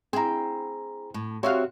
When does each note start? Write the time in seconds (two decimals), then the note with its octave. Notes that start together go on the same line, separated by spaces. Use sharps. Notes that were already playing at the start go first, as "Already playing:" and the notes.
0.13 C4 E4 G#4 A#5
1.14 A2
1.43 C4 F#4 G4 C#5 E5 F5